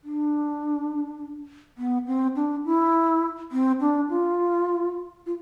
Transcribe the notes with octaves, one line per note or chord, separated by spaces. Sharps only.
D4
B3
C4
D4
E4
C4
D4
F4
F4